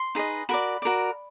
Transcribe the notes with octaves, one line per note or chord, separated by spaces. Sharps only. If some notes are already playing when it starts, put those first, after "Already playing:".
Already playing: C6
D#4 G#4 B4 D#5
F#4 A#4 D5 B5
F#4 A#4 D5